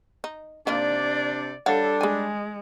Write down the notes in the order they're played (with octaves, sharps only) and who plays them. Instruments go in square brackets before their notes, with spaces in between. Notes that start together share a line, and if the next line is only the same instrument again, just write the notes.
[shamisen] D#4
[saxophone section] C3 D4 [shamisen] A#3 D#4 F4 [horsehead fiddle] D5
[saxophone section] G3 D4 [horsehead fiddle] A4 [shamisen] C#5 F5 F#5
[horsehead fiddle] G#3 [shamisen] G#4 G#5